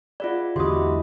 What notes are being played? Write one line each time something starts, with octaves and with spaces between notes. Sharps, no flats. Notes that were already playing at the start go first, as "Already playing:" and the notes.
F4 G#4 B4 D5 E5 F#5
E2 G#2 D3 E4 F#4 G4 C6 D#6